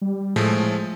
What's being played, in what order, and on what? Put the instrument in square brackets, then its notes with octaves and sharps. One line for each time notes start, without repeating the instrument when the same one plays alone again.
[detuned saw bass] G3
[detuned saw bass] A2 [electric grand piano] F3 G#3 A3